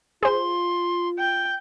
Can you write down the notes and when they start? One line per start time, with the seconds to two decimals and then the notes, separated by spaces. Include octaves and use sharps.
0.23 F4 G#4 C5 C6
1.19 G5